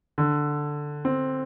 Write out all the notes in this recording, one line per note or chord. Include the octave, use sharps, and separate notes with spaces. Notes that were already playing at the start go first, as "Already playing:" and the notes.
D3
C4